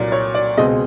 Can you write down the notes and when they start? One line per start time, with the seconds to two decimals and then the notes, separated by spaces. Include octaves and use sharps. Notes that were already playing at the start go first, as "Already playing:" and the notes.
Already playing: C2 A#2 F#3 A#3 D5
0.12 C#5
0.35 D5
0.57 C#2 B2 G#3 C4 D#5